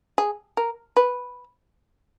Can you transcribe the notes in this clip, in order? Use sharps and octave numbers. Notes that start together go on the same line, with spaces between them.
G#4
A#4
B4